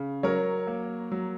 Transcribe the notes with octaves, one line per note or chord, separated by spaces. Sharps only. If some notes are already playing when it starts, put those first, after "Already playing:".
Already playing: C#3
F#3 A#4 C#5
A#3
F#3